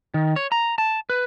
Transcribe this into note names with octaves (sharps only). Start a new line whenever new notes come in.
D#3
C#5
A#5
A5
B4